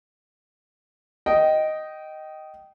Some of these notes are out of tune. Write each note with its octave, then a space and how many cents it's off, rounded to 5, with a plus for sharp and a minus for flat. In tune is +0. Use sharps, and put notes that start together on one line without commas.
D#5 +0 G5 -20